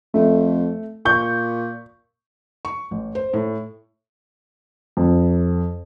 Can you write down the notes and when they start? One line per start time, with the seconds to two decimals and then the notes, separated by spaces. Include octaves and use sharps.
0.14 F2 A3
1.05 A#2 C#6 G6
2.65 C#6
2.91 A1
3.15 C5
3.34 A2
4.97 F2